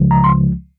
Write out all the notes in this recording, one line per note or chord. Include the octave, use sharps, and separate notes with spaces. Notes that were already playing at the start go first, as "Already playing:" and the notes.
Already playing: C#2 C#3 F3 G#3
A#5
C6